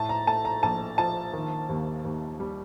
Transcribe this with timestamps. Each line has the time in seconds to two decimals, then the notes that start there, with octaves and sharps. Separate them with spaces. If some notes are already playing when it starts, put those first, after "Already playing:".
Already playing: A2 A5
0.09 A#5
0.27 A3 A5
0.45 A#5
0.63 A#1 A5
0.98 F3 A5
1.33 D#3
1.69 D#2
2.04 D#2
2.40 G3